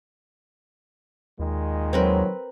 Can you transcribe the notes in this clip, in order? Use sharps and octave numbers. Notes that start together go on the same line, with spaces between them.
D#2 A#2 D#3 G#3
F#3 C4 A#4 B4